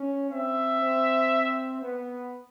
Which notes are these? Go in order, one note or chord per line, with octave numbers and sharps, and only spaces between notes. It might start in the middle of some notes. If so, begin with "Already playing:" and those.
Already playing: C#4
C4 E5
C4
B3